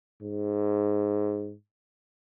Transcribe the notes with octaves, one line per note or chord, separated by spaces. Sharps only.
G#2